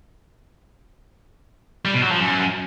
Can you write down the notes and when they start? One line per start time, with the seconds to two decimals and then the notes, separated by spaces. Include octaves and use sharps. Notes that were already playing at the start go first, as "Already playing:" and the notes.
1.85 G3
1.94 B2
2.03 F#3
2.11 F3
2.20 F#2